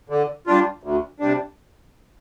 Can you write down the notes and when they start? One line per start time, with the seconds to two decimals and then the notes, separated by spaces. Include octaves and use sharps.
0.10 D3
0.47 G3 D4 F4
0.83 D2
1.20 C3 G3 D4